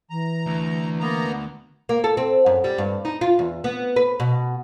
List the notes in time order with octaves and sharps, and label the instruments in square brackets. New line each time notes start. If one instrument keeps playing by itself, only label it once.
[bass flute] E3 [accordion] A#5
[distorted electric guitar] D2
[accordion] A#3 B3 A#5
[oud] A#3
A4
C4
F#2
G3
G2
D#4
F4
E2
B3
B4
B2